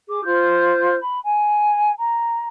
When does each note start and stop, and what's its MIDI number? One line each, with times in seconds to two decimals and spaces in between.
0.08 0.24 68
0.08 0.24 86
0.25 0.96 65
0.25 0.96 72
0.25 0.96 89
0.25 0.96 91
1.00 1.18 83
1.23 1.91 80
1.97 2.48 82